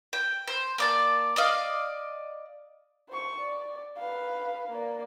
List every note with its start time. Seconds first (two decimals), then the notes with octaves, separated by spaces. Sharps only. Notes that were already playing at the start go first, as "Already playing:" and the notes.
0.13 G5
0.47 C5
0.78 A#3 D5 A5
1.36 D5 D#5 F5
3.09 C5 C#6
3.40 D5
3.98 B4 F5
4.69 A#3 D5